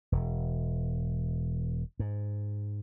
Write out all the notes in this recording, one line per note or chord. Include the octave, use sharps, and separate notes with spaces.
E1
G#2